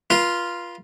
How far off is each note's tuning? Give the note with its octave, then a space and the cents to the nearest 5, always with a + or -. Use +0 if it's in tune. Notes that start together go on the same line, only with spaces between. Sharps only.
F4 -5 B4 -40